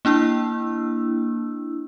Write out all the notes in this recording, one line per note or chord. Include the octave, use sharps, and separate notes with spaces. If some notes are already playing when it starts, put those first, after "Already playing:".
A#3 D4 E4 E6